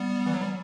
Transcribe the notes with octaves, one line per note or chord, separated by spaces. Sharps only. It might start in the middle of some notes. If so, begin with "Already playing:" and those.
Already playing: G3 B3
E3
F#3
G3